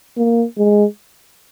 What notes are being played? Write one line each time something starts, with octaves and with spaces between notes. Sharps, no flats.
A#3
G#3